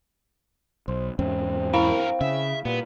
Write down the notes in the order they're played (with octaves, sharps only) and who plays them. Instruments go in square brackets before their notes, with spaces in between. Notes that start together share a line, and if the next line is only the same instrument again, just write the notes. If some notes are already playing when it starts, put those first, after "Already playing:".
[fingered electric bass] B1 [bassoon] C5
[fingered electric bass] E2 G#2 C#4 [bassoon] C4
[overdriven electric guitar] G2 A#4 [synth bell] E4 F5 B5
[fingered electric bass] C#3 [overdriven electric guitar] E5
[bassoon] G2 [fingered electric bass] A#2 [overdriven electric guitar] B3